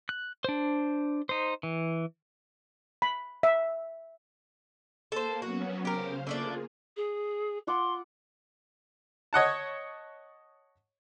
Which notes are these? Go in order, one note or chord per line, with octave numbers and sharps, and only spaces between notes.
F#6
D4 C5
D#4 C5
E3
B5
E5
A#3 A4 C5
F#3 B3 C#4 F#4
C#3 G4 A#4 C5 F5
D3 A3 A#3 F4 G#4 D5
G#4
F4 F#5 C6 D6
C#5 D#5 F#5 A5